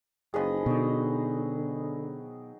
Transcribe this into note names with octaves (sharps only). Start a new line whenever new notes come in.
F#1 D#3 F3 G#4 B4 D#5
B2 D3 F#3 D#4